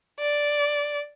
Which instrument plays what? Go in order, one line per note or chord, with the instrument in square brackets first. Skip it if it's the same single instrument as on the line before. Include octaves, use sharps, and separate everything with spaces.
[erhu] D5